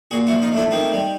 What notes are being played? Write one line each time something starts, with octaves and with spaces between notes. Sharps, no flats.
A#2 F#4 G#4
E4 F#4
F3
D#4 F4
A3 D4 E4
D#3 A#3 C4
G3